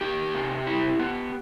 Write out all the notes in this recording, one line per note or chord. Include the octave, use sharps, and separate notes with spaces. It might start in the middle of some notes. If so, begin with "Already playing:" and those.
D#4 G4
C3
E4
B3